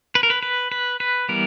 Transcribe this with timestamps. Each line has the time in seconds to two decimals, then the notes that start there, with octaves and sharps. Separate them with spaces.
0.15 B4
0.23 A#4
0.30 B4
0.43 B4
0.72 B4
1.00 B4
1.29 E3 G3 B3 A#4